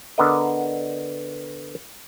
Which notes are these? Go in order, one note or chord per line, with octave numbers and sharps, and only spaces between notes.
D3 B3 A#4 D#5